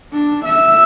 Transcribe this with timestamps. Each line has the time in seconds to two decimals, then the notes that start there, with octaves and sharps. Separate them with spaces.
0.13 D4
0.45 E5